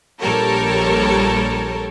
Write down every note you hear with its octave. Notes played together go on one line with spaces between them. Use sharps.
A#1 G3 A4 A#4 C#5